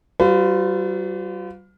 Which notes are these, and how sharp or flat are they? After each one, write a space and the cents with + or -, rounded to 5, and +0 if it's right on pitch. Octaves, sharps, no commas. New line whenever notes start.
G3 -40 F4 +20 B4 +45